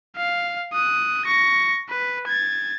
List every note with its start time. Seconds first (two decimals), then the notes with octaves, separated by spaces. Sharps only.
0.17 F5
0.73 D#6 F#6
1.26 C#6 A#6
1.89 B4
2.28 G#6 A6